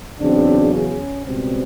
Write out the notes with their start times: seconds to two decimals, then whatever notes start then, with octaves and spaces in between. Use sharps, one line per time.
0.20 E2 C#3 F#3 C4 D4
0.72 C#4
1.25 C#2 B2 G3 C4